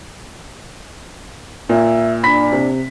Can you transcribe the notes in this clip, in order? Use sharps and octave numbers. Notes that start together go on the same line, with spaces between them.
A#2 E5
D4 B5 B6
C3